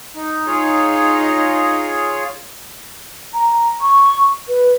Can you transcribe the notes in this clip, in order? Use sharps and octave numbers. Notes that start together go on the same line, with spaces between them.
D#4
D#4 F4 G#4 C#5
A#5
C#6
B4